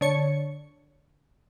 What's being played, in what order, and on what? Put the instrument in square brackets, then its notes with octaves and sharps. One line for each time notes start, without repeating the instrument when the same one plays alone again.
[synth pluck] D3 C#5 C#7